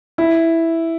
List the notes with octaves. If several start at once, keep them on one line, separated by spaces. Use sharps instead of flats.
E4